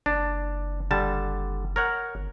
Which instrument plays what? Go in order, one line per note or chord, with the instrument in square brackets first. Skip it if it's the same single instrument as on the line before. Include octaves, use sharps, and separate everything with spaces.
[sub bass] F#1 [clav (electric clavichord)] D4
[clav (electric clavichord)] D3 G3 A5
A#4 C#5 F#5
[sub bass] G1